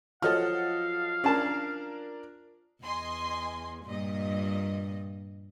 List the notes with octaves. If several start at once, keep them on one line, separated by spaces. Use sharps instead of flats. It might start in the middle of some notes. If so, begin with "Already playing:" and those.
F3 F#3 A4 D#5 F5 F#5 F6
C#4 D4 A#4 A5
E2 D#5 G#5 C6
G2 A#2 D#5